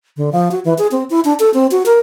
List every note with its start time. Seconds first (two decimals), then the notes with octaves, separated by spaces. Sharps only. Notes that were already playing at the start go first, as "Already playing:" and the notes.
0.17 D3
0.32 F3
0.51 F#4
0.65 E3
0.78 G#4
0.92 C4
1.10 E4
1.25 D4
1.40 A4
1.54 C4
1.71 F#4
1.86 A#4